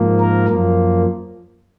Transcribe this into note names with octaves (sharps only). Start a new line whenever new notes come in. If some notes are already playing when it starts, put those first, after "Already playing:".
Already playing: G#2 F3 A#3
A#4
F#2 F3 A#3